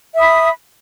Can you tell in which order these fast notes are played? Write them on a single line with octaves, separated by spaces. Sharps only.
E5 D#6 B5